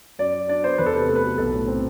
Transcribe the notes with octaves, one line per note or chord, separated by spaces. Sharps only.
F#2 D5
F#3
D4 D5
B3 C5
E2 B4
A4
C3 B4
A3 A4
B4
F#3 A4
B1 A4
A2
C4